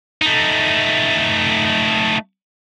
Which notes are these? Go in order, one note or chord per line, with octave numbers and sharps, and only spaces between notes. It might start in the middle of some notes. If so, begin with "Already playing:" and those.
A3 D#4